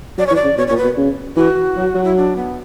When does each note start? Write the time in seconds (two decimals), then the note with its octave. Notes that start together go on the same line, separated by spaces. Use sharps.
0.18 F#3 D5
0.27 C#5
0.31 E3
0.36 D5
0.44 C#3
0.57 B2 C#5
0.67 A#2 C#5
0.77 B4
0.84 B2
0.97 C#3
1.36 E3 F#4
1.77 F#3
1.95 F#3
2.04 E4
2.16 D4
2.36 B3